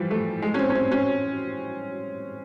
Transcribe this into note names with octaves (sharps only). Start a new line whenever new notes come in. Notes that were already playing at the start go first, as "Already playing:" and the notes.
Already playing: E3 F3 G3
A3
G#3
C#4
C4
C#4
C4
C#4